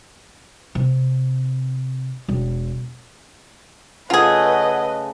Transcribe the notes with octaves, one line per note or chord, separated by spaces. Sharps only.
C3
E1
C#3 A3 F4 G#4 B4 D#5 F#5